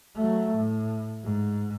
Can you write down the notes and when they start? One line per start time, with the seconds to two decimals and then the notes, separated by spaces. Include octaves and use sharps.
0.16 F#3 A3
0.56 A2
1.24 G#2